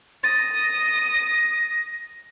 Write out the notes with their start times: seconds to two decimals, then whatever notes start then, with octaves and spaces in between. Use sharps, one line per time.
0.24 D#6 A6 A#6